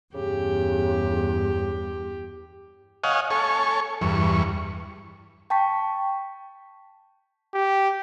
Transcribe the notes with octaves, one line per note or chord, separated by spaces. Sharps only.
E2 G2 C#3 G4
C#5 D#5 F5 F#5 G#5
A4 C#5 G#5 C#6
E2 G2 C#6
G5 A5 C#6 B6
G4